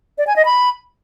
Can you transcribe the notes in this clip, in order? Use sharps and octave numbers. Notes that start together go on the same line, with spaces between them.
D5
G#5
D#5
B5